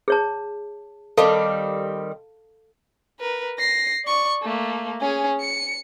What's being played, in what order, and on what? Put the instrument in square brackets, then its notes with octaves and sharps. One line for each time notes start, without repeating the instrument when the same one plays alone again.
[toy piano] G#4 C#5 A5
[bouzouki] D#3 G3 C4 [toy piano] A4 F5 A5
[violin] A#4 B4
A#6 C7
D5 C#6
A3 A#3
C#4 G#4
C#7